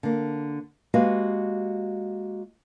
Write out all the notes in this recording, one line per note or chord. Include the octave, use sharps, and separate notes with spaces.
D3 A#3
G#3 A#3 F#4 G4 B4 F5